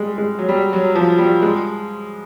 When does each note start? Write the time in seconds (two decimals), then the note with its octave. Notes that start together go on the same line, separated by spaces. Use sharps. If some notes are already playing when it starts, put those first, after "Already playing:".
Already playing: G3 G#3
0.18 G#3
0.39 F#3
0.49 G3
0.73 F#3
0.95 F3
1.18 G3
1.42 G#3